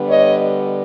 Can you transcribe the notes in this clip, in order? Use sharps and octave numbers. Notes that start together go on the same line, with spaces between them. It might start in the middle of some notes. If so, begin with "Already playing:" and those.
Already playing: D3 G3 B3
C#5 D#5